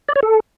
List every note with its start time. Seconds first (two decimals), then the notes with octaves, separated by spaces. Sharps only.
0.09 D5
0.16 C#5
0.23 A4